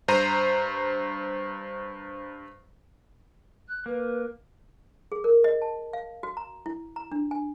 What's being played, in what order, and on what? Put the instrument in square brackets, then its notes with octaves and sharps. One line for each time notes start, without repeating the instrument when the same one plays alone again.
[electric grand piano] G2 C5 A#5 D#7
[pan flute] F#6
[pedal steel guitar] A#3 [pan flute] B4
[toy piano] G#4
A#4
D#5
A5
F5
F#4
A#5
E4
A#5
D4
G#5